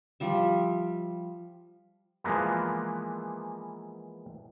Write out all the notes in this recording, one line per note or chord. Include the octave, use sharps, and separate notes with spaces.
F3 G3 E5
E3 F3 G#3 A#3 B3